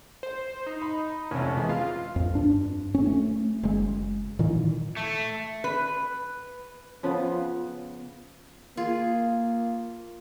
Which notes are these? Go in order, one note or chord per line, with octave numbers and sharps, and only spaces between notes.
C5
D#4
B5
F1 C3 C#4
E3 G#3 B3
F4 F5
F2
G2 D4
C#4
A3 C#4
F#1 G#3
A#2 D#3 E3
A3
B4
C#3 F3 B3
A#3 F4 G#4